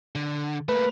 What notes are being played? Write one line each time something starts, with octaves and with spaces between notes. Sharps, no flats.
D3
A3 A#3 B4